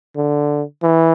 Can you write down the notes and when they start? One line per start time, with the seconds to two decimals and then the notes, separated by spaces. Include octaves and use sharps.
0.16 D3
0.83 E3